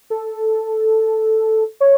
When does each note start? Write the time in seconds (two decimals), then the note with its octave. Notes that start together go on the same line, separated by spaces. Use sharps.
0.10 A4
1.80 C#5